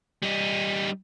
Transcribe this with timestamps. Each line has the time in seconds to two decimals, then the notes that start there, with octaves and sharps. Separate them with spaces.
0.22 G3 D#4